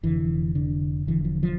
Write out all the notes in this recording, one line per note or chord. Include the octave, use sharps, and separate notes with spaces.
F1 F2 D3 E3
D3
E1 E2 D3 E3
F3
F3